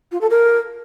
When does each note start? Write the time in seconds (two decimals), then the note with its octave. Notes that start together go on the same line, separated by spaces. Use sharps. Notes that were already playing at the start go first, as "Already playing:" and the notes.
0.12 F4
0.21 A4
0.30 A#4